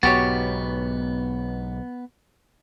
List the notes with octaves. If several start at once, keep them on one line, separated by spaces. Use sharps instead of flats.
B1 G#2 B3 F#4 G4 C#5 A6